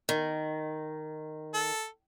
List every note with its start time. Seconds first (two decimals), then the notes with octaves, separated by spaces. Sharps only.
0.09 D#3
1.54 A4